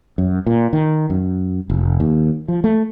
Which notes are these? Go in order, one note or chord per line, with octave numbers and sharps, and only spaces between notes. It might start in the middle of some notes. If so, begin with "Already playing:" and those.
F#2
A#2
D#3
F#2
F1
D#2
F3
A3